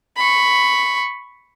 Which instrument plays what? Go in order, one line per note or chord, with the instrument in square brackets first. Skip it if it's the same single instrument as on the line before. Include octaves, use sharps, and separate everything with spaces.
[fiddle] B5 C#6